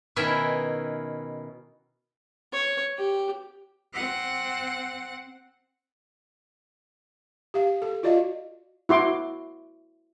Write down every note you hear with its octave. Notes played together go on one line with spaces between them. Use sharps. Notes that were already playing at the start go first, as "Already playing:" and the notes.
B2 D#3 C#4 E4 E5 G#5
C#5
G4
C4 F#5
G4 F5
A4
F4 F#4 D5 D#5 F5
E4 F#4 C6 D6